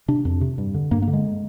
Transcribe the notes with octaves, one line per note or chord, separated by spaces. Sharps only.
C3 D4
F2
C3
G2
D3
G2 A#3
A#3
D3
G#3